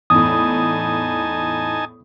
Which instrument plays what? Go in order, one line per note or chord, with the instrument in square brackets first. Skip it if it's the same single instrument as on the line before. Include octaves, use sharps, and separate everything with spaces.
[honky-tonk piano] E2 A2 [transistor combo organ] D#4 G#5 A5 [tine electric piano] D#6